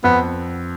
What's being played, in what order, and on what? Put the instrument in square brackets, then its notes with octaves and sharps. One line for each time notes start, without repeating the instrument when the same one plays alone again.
[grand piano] F2 [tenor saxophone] B3